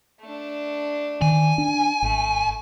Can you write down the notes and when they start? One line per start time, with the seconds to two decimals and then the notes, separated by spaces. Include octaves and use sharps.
0.22 A3 D4
1.22 D#3 G#5
1.58 D4
2.02 G#1 A3